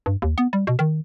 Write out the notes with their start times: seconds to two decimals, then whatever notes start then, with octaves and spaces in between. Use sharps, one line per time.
0.06 G2
0.22 D#2
0.38 B3
0.53 G3
0.67 B2
0.79 D#3